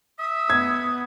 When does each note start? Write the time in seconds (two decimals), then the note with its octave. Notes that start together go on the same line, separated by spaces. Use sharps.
0.19 E5 D#6
0.50 B3 G#6